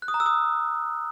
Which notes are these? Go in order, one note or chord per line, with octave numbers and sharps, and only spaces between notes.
F#6
D#6
A#5
E6
D#6